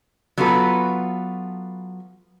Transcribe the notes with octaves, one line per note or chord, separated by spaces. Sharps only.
F#3 B3 F4 F#4 A4 B4